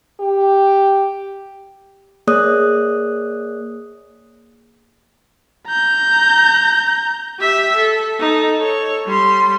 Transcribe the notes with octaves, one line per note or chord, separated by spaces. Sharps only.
G4
A#3 G#4 C#5 D5 D#6 F#6
A#5 G6
G4 E5
A4
D#4 A4
A4 C#5
G3 C6